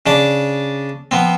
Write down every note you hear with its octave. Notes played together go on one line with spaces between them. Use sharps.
C#3 D4 D5
F3 B3 C4